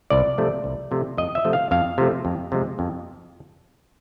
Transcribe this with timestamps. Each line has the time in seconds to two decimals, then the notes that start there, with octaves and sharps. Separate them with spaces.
0.10 C2 D5
0.38 C3 F3 A3
0.64 C2
0.91 C3 F3 A3
1.18 F2 D#5
1.35 E5
1.45 C3 F3 A3
1.53 F5
1.71 F2 F5
1.98 C3 F3 A3
2.25 F2
2.52 C3 F3 G#3
2.79 F2